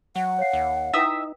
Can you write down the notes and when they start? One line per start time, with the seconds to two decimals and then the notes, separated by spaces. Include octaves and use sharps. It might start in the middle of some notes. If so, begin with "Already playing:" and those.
0.16 F#3 F#5
0.39 C#5 F5 C7
0.53 D#2
0.94 D#4 E4 B4 E5 G5 D#6 E6